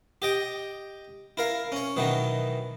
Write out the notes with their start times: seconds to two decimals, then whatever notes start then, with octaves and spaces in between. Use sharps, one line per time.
0.22 G4 D#5 G5
1.37 E4 A#4 F5
1.72 C#4 C#5
1.96 B2 D#3 E3 F#3 B3